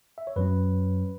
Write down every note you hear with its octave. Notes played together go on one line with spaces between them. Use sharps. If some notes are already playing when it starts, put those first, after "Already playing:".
E5
C#5
F#2 F#3 C#4 B4